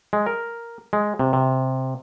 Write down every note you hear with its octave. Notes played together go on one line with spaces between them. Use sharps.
G#3
A#4
G#3
C3
C3